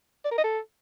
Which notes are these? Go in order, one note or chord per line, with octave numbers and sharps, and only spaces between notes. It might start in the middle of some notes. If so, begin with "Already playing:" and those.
D5
A#4
D#5
A4